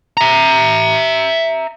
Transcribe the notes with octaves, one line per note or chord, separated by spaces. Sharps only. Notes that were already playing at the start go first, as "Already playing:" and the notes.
E5 A#5